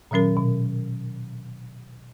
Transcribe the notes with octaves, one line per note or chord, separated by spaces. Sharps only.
A#2 D#3 F#3 C#4 A#4
B2